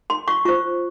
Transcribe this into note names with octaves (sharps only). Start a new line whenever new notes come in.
C6
C#6
F4 C5 C#6